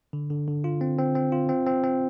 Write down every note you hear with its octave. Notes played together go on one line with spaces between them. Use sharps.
D3
D3
D3
F4
C4
C4
C4
F4
C4
C4
C4